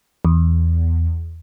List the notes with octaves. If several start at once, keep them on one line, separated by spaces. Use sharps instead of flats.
E2